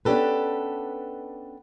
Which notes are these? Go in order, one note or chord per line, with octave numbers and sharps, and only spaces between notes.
B3 C#4 D4 G4 A4 B4